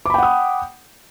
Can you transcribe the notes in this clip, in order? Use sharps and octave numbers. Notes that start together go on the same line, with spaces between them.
F#5 G5 B5 D6 D#6